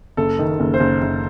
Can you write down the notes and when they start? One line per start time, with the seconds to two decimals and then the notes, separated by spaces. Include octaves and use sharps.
0.17 F#1 A4
0.39 D#3
0.60 F#1
0.74 C5
0.80 F#1
1.02 F#1